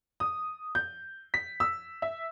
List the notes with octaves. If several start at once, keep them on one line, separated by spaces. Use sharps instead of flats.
D#6
G6
B6
E6
E5